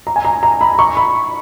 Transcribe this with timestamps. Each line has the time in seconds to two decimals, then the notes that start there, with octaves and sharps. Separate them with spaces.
0.07 A#5
0.16 G#5
0.25 A#5
0.43 A#5
0.61 B5
0.79 C#6
0.97 B5